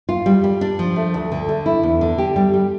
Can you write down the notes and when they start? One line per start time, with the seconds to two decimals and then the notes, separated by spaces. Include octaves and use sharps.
0.09 F4
0.26 G3
0.44 G3
0.61 D4
0.79 F3
0.96 A3
1.14 D2
1.32 D3
1.49 A3
1.66 E4
1.83 E2
2.01 D3
2.18 G4
2.36 G3
2.54 G3